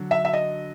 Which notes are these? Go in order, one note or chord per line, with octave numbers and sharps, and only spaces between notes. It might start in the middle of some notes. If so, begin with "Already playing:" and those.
Already playing: D3 F#3
E5
E5
D#5